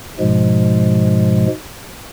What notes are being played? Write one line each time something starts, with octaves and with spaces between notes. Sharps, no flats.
G#2 B2 F3 G#3